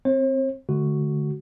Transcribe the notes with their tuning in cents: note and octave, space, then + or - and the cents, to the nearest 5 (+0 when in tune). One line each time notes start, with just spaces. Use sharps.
C4 +0 C5 +45
D3 +10 A3 -35 F#4 +0